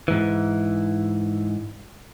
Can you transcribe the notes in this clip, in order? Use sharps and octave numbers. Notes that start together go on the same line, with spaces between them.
G#2 E3